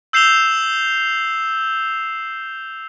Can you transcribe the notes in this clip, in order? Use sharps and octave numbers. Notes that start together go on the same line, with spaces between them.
E6 G6 C7 E7 F7 G7